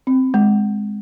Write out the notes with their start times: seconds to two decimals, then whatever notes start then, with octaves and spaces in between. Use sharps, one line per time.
0.07 C4
0.34 G#3